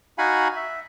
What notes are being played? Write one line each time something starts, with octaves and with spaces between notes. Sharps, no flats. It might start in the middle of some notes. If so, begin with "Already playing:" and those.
D#4 F#4 F5 F#5 G#5 B5
E5